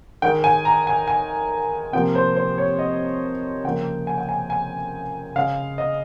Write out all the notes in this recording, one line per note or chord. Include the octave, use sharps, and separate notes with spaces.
D#3 G#3 G5
G#5
A#5
G#5
G#5
C3 F3 A#3 G5
C5
C5
C#5
D#5
C#3 F3 A#3 G5
G#5
G5
G#5
G#5
C#3 G#3 F5
D#5